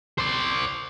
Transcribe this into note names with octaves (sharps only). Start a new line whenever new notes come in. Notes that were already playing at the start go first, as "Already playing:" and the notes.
C5 D5